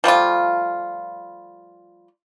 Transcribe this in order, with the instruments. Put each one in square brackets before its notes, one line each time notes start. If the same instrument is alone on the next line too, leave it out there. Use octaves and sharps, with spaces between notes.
[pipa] F3 G3 A3 F4